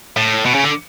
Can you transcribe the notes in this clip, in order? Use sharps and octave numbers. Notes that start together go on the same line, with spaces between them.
A2
B2
C#3
D3